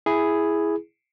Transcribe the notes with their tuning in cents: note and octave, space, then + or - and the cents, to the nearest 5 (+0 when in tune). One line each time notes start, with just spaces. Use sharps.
E4 +0 G#4 +0